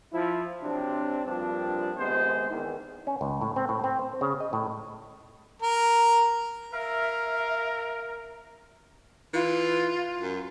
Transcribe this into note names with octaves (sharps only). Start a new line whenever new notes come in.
F3 E4
C3 F#3 C4 D4
G2 A#2 F3 C4 D4
D#2 C3 G#3 B3 C5
E2 D#3 E3
C#4
C#2
A2
C4
A2
C4
C5
C#3
D#5
A2
A#4
A#4 E5 F5
E3 F4
F#2